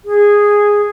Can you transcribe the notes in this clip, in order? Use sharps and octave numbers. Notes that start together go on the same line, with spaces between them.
G#4